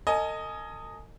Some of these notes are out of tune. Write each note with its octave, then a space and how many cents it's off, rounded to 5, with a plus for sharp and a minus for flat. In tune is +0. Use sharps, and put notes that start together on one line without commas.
A4 +45 D#5 +0 G#5 +15